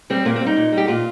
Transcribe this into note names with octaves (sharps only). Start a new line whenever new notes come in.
G3 C4
A#2 A#3
C4
G3
D#4
A#2
G3
G4
A#2 F4